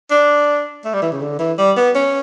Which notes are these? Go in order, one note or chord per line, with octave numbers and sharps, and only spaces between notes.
D4
A3
G3
E3
C#3
D3
E3
G3
B3
C#4